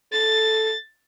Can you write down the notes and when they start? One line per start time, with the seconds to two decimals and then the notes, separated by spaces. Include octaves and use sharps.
0.13 A4 A6